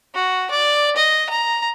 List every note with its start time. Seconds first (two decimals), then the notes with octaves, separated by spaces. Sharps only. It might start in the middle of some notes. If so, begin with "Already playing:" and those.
0.14 F#4
0.51 D5
0.96 D#5
1.30 A#5